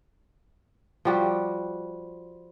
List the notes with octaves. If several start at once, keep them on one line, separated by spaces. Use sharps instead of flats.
F3 G3 F#4